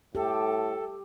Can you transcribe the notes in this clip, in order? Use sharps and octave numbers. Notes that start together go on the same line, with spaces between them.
A2 G4 A4